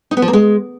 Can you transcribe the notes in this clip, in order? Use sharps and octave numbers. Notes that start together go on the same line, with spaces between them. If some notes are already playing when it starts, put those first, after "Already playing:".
D#4
B3
F3
A#3
G#3